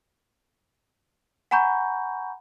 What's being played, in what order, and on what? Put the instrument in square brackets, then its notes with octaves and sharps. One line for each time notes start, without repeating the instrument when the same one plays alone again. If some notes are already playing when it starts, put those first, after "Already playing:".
[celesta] F#5 G#5 A#5 B5 C#6 G6